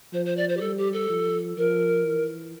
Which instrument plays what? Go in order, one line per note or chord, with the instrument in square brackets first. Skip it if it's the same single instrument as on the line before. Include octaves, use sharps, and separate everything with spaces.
[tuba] F3 [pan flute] C5
[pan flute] C5
D5
C5
G4
[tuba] G3 [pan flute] A4
[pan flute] G4
A4
[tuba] F3
[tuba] F3 [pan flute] A#4
[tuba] E3